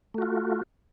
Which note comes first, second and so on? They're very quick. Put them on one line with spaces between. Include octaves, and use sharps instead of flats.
A3 F#4 F4